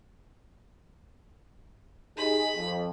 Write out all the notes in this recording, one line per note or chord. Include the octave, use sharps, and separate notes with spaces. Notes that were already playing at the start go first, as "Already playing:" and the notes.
D#4 G4 G#4 B5
F2